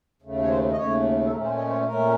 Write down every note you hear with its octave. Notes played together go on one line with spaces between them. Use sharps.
D#2 C#3 A3
C#5
C5
D#5
D#2 C#3 A3 C#5
A4
A#2 A3 C#4 A#4
C5
C#5
D#5
C5
C#5
A#2 A3 C#4 A#4